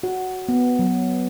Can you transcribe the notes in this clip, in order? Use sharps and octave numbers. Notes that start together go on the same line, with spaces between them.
F#4
B3
F#3